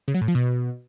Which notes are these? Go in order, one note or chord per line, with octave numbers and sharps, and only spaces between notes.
C#3
F#3
A2
F3
B2